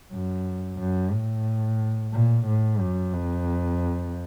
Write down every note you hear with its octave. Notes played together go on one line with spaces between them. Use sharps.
F#2
F#2
A2
A#2
A2
F#2
F2